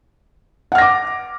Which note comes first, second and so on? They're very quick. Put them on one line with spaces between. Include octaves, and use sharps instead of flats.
F#5 F6 A#6 D6